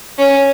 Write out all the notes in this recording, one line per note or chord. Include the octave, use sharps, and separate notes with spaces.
C#4